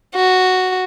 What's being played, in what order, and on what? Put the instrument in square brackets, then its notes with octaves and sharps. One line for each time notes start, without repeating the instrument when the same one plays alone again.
[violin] F#4